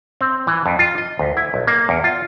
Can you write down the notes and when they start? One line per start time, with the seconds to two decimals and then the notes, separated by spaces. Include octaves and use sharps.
0.21 C4
0.47 E3
0.66 F2
0.79 F4
0.98 D#5
1.19 D2
1.37 E4
1.54 B1
1.67 A#3
1.89 E2
2.04 F4